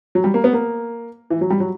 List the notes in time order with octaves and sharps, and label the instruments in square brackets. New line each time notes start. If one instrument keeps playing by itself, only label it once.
[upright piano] F#3
G3
A#3
B3
A#3
E3
F#3
G3
F#3